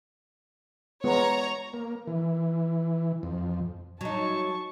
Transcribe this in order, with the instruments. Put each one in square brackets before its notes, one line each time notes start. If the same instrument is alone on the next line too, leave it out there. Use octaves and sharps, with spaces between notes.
[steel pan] G#3 B3 F4 [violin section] C#5 A#5
[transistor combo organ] A#3
E3
F2
[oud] F#3 D#4 [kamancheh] A5 C#6